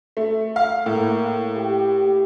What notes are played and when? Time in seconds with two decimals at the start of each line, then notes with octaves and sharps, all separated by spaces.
0.17 A3
0.56 F5
0.86 A2 A#3
1.56 G4